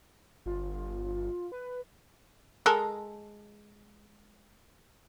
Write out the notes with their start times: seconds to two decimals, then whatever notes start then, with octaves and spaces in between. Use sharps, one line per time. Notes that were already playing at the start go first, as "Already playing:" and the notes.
0.46 G1 F4
1.52 B4
2.66 G#3 A4 A#4